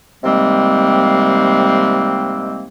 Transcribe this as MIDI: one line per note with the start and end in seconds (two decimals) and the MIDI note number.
0.24 2.67 48
0.24 2.67 51
0.24 2.67 55
0.24 2.67 56
0.24 2.67 58
0.24 2.67 60